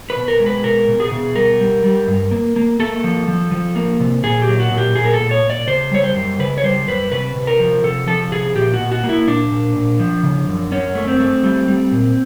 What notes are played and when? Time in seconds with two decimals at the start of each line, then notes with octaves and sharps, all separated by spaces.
0.10 B4
0.16 B2
0.28 A#4
0.40 G#3
0.46 B4
0.64 B2 A#4
0.88 B2
1.00 G#4
1.12 B2
1.36 G3 A#4
1.60 G3
1.84 G3
2.08 G2
2.31 A#3
2.56 A#3
2.80 A#3 A4
3.04 F3
3.28 F3
3.51 F3
3.76 A#3
4.00 C3
4.24 A#2 G#4
4.42 G4
4.48 F#3
4.60 F#4
4.71 A#2
4.78 G4
4.96 A#2 G#4
5.05 A#4
5.13 A4
5.20 A#2
5.31 C#5
5.43 A#2
5.50 D5
5.67 C#3 C5
5.91 G3 C#5
6.04 C5
6.16 F#2
6.40 C#3 B4
6.58 C#5
6.64 G3 C5
6.88 F#2 B4
7.12 C3 B4
7.35 C3
7.47 A#4
7.59 F3
7.84 C3 A4
8.07 F3 A4
8.31 C3 G#4
8.55 A#2 G4
8.74 F#4
8.79 A#2
8.92 F#4
9.04 A#3
9.09 E4
9.27 A#2 D4
9.51 A#2
9.76 A#2
10.00 F3
10.23 C#3
10.48 F#2
10.71 F#2 C#4
10.95 A3
11.08 C4
11.20 A3
11.44 G3
11.68 G3
11.92 A#2